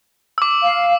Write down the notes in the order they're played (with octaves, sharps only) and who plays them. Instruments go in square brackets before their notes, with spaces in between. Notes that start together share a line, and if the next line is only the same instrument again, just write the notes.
[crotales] D6 E6
[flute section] F5